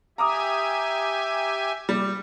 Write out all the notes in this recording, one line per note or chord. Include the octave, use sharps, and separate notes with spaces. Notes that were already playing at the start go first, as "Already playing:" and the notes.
G4 E5 G#5 A#5 D6 D#6
G3